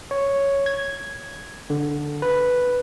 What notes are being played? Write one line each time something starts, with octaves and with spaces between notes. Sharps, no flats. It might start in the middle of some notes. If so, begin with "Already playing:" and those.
C#5
G#6
D3
B4